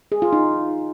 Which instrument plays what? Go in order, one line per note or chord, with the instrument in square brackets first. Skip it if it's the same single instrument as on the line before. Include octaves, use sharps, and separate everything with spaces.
[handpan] G#4
F4
D#4